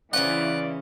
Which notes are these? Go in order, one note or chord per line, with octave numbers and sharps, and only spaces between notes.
C#3 E3 C#4 F4 D5 F#5